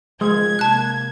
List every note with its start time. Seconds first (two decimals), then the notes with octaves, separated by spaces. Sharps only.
0.21 F3 G#3 G#6
0.59 C3 A#3 A5 F#6